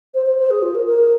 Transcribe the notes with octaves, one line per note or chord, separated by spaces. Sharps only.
C5
C5
C5
G#4
F4
A#4
A#4